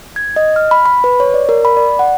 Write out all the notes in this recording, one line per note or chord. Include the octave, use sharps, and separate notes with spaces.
G#6
D#5
F6
B5
B5
B4
C#5
D5
A#4
B5
D5
F#5